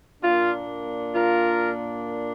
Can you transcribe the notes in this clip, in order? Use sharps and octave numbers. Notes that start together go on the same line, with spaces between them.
A#2 A#3 D4 F4
F4 A#4